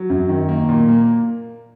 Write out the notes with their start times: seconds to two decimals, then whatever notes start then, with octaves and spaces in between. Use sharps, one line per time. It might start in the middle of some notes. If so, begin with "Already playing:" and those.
Already playing: F#3
0.10 F#2
0.29 D#3
0.49 A#3
0.69 A#2
0.89 A#3